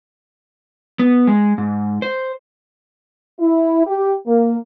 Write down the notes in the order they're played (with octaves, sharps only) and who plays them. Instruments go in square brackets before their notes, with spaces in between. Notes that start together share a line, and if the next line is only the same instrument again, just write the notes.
[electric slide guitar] B3
G#3
G#2
C5
[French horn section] E4
G4
A#3